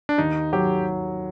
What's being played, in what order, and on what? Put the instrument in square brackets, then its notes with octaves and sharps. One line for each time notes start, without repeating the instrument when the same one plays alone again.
[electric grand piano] D4
[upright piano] D#2 [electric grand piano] D#4
[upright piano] F#3 [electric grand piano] G4